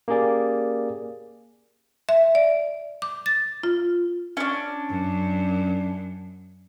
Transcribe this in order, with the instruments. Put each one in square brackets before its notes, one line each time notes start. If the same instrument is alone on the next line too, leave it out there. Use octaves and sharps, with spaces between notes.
[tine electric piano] A#3 C#4 G4 G#4 D5
[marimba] E5
D5
D6
A6
F4
[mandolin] C#4 D4
[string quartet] F#2